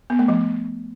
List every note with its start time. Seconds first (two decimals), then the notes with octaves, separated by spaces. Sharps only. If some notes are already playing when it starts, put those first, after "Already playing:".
0.10 B3
0.19 A3
0.28 F3